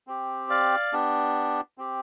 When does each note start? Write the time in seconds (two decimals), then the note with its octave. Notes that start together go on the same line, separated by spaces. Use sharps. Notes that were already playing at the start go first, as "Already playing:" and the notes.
0.07 C4 G4
0.50 D5 F5
0.93 B3 D4 G4
1.78 C4 G4